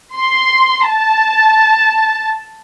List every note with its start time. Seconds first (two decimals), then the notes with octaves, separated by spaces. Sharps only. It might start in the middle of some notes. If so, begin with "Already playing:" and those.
0.18 C6
0.90 A5